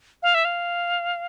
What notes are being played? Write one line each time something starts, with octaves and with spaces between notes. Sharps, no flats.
F5
E5
F5